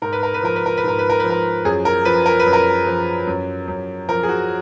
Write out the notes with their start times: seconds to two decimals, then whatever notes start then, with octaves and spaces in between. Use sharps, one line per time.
0.02 G#2 A#4
0.13 B4
0.23 A#4
0.34 B4
0.43 F3 A#4
0.56 B4
0.66 A#4
0.77 B4
0.84 G#2 A#4
0.99 B4
1.10 A#4
1.20 F3 B4
1.30 A#4
1.65 F#2 G#4
1.85 A#4
2.05 F3 B4
2.26 A#4
2.40 B4
2.46 F#2
2.53 A#4
2.87 F3
3.27 F#2
3.68 F#2
4.09 F3 A#4
4.23 G#4
4.29 F#4